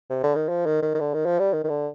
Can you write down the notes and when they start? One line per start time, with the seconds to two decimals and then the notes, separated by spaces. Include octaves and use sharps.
0.10 C3
0.23 D3
0.35 D#3
0.49 F3
0.66 D#3
0.82 D#3
0.95 D#3
1.00 D3
1.14 D#3
1.26 F3
1.39 G3
1.53 D#3
1.64 D#3
1.69 D3